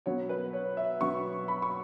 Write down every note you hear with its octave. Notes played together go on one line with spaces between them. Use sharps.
B2 F#3 B3 C#5
B4
C#5
E5
B2 F#3 B3 C#6
B5
C#6